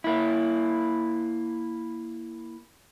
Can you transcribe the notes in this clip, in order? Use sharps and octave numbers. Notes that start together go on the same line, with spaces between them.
A#3 E4